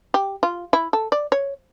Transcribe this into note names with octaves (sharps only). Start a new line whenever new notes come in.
G4
F4
E4
A4
D5
C#5